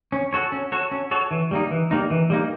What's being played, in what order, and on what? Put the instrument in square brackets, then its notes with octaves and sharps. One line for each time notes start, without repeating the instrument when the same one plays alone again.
[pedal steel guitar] C#4
F#4 A4 C#5
C#4
F#4 A4 C#5
C#4
F#4 A4 C#5
E3
G3 A#3 D#4
E3
G3 A#3 D#4
E3
G3 A#3 D#4